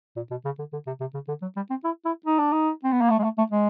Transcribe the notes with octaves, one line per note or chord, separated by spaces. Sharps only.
A#2
B2
C#3
D3
D3
C3
C3
C#3
D3
F#3
G3
C4
E4
E4
D#4
D4
D#4
C4
B3
A#3
A3
G#3
A3
A3
G#3